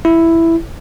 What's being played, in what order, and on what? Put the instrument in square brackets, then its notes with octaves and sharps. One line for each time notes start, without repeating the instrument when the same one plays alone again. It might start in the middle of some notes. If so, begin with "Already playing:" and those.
[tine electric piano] E4